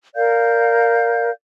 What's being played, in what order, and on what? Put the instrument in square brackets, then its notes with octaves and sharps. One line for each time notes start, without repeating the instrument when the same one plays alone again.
[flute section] A#4 D5 F5 G6